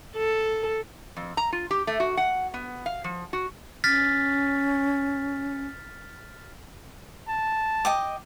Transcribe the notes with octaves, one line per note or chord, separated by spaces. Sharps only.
A4
F2
A#5
F4
G4
A3
F#4
F#5
B3
F5
F3
F#4
C#4 F6 A6 B6
A5
D#5 G5 D6